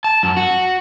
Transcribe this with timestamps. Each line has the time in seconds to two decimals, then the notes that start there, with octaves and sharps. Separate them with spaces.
0.04 A5
0.23 F#2
0.37 F#4